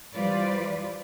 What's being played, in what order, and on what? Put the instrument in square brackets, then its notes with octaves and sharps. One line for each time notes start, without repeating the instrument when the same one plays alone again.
[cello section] E3 G3 F4 B4 C5 D5